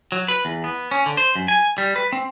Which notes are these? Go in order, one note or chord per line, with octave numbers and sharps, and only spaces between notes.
F#3
B4
E2
B3
C#4
D3
C5
F#2
G#5
G3
B4
C4